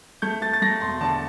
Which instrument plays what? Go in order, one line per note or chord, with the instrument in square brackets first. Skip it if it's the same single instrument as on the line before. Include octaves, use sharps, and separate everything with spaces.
[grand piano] A3 G6
A3 A6
A6
A3 A#6
E1 C6
D3 A5